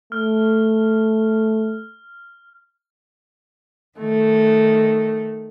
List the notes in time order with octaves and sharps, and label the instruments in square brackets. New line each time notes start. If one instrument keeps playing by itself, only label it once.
[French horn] A3 [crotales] F6
[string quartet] D#3 A3